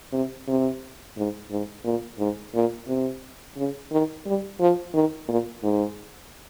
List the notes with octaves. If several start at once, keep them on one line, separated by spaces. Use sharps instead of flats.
C3
C3
G#2
G#2
A#2
G#2
A#2
C3
C#3
D#3
G3
F3
D#3
A#2
G#2